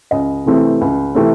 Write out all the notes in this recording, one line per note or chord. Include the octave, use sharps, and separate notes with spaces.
C#2 D#5
C3 E3 A3 C4
C#2
C3 E3 A3 C4